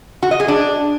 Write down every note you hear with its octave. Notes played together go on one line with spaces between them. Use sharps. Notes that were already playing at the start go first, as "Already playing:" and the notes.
F#4
D#5
G#4
D4